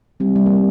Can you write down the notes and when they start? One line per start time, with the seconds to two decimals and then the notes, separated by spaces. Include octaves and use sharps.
0.20 G3 C4
0.36 G3
0.46 A#3
0.52 G3